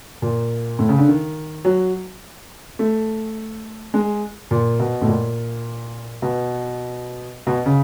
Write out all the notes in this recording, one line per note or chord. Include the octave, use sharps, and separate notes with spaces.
A#2
A2
C#3
D3
D#3
F#3
A3
G#3
A#2
B2
A2
A#2
B2
B2
C#3